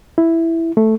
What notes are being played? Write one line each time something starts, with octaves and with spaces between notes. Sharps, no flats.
E4
A3